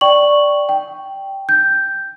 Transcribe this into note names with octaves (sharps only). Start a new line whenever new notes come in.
D5 G5 C#6 F#7
G5
G6